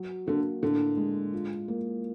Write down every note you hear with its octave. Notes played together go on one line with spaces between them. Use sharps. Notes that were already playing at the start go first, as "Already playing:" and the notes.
Already playing: F#3
D3 A#3
A2 D3
G#3
F4
A#3